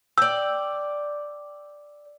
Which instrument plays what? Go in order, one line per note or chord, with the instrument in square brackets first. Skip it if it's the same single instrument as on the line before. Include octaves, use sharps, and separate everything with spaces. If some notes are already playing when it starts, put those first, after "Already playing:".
[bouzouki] D5 G5 [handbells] E6